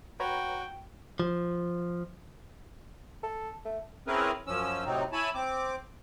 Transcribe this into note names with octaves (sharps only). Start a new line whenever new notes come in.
F#4 B4 C#5 G5 A#5
F3
A4
A3
C4 C#4 E4 G#4 A#4 B4
F#2 F3 C#4 E6
A2 C3 F#3 C4 D#4
E4 C#5 G#5 A5 B5
C4 D6